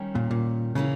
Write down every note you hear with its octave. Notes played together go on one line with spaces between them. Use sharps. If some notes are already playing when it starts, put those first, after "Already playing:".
Already playing: D#3 G3 C#4
A#2
A#2
C#3 E3 A#3 C#4